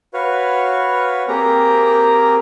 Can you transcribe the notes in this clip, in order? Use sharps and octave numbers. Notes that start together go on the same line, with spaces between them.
F#4 B4 C#5 F5
A#3 C4 G4 G#4 A#4 A#5